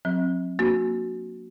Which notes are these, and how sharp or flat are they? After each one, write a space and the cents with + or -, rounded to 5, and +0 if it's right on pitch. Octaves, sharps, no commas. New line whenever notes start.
F#3 -40 C4 +25
A#3 +0 D4 +0 F#4 +0